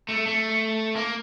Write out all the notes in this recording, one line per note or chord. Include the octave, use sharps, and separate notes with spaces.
A3
A3
A#3